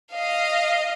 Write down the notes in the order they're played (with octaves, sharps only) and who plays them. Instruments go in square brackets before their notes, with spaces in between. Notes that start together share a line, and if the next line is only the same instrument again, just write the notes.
[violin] D#5 F5